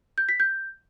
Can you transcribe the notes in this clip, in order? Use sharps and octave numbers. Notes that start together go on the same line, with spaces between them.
G6
B6
G6